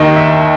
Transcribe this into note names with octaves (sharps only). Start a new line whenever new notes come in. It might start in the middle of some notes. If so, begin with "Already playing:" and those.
Already playing: D#2 D#3 D#5
E5